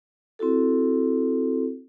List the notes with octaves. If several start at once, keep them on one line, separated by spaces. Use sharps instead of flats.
C4 E4 F#4 A4